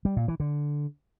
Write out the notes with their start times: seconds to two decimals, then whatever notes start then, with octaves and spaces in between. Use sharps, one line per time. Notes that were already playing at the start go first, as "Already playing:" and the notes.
0.05 G3
0.17 A#2
0.28 E3
0.40 D3